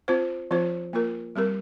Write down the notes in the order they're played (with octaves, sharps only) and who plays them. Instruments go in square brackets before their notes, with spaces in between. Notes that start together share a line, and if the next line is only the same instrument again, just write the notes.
[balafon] C4 F4 C5
F3 C4 F4 C5
A#3 F4 A#4
G3 C4 G4 A#4